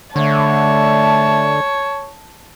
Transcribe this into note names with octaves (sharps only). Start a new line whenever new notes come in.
D3 A3 C#5 A5